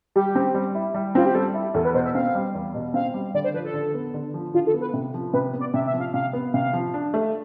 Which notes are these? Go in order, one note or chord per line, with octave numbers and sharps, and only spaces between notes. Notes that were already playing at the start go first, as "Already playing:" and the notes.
G3 G4
C4
G3
E4
G3
C4 F4
G4
G3 A4
E4
E2 A4
B4
B2 C5
E5
C4 F5
G3
E2
B2
C4 F5
G3
D3 D5
C5
F3 B4
A4
D3
B3
D3
F3
D3 F4
A4
B3
B4
C3
F3
C3 B4
B3
D5
C3 E5
E5
F3
F5
C3 F5
B3
C3 F5
F3
D4
A3